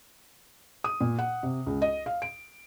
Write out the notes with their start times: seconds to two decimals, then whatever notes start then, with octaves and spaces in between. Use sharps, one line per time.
0.84 D#6
1.01 A#2
1.19 F#5
1.43 C3
1.66 C#2
1.82 D#5
2.06 F5
2.22 D7